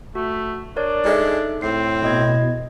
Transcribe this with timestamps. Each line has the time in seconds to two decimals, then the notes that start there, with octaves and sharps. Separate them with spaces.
0.15 A3 F#4
0.76 D4 A#4 C#5 D5
1.05 G#3 D#4 A4 E5
1.62 A2 C4 C7
2.02 B2 E4 D#5 G#6